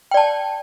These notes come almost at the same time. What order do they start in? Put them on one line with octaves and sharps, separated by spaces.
G5 D5 A5